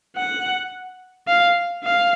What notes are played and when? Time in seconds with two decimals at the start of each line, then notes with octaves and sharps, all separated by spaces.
0.16 F#5
1.27 F5
1.84 F5